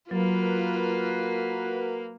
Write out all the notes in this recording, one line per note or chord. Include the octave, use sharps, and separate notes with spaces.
F#3 A#3 F4 F#4 A#4 B4